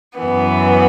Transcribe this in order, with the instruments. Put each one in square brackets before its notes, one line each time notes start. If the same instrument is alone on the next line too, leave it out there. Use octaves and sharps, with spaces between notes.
[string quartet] F#2 E3 B3